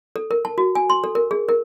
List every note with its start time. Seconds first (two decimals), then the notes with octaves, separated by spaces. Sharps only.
0.16 A4
0.31 A#4
0.45 A5
0.58 F#4
0.75 G#5
0.90 C6
1.04 A4
1.15 A#4
1.31 G#4
1.49 A#4